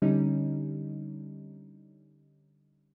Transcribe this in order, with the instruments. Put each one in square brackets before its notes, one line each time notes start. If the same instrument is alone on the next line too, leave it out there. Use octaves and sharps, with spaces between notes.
[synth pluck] D3 G3 C#4 D#4